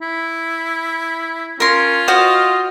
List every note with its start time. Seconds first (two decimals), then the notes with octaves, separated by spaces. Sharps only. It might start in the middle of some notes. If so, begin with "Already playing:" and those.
0.01 E4
1.60 C#4 F4 A#4 C6
2.08 F#4 C5 D#5 F5